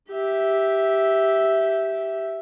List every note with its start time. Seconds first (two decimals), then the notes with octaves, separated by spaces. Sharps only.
0.10 G4 E5